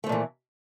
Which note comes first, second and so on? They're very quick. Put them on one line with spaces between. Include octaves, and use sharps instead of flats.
A3 F3 A#2 E3